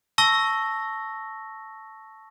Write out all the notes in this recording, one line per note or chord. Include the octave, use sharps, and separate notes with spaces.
A5 C#6 E6 A#6 G7